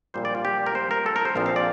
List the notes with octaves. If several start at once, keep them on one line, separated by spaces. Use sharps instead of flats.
A#1 A#2 G3 C5
D5
F4
G4
A#4
C5
A#4
A4
A#4
C5
A#1 A#2 F3 C4 F5
F5
D5